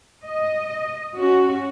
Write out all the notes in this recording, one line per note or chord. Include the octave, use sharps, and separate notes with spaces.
D#5
C#4 F#4